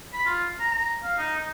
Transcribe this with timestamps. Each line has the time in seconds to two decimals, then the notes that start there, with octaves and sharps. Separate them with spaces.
0.13 B5
0.26 F4
0.60 A#5
0.71 A#5
1.03 F5
1.18 D#4
1.37 D#4